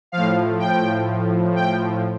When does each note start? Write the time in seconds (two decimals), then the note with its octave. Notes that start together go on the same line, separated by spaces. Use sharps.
0.12 A2 F3 F5
0.59 G5
1.56 G5